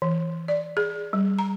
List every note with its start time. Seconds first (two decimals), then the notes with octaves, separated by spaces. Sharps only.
0.02 E3
0.48 D5
0.77 G#4
1.13 G3
1.39 A#5